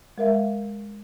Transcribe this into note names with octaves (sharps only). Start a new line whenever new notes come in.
G#3 A#4 E5 F5